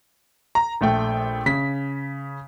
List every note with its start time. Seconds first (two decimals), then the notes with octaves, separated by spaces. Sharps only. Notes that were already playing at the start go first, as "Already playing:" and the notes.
0.55 A#5
0.81 A#1 A3 G5
1.46 C#3 B6